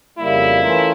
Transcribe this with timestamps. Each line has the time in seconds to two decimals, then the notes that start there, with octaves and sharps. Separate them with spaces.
0.18 F2 C#3 G3 A#3 E4
0.60 E3 A3 C#4 F4 A#4